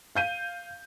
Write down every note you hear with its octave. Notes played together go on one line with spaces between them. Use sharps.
F5 G6 D#7